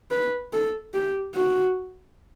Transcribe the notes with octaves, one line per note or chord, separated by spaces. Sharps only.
B4
A4
G4
F#4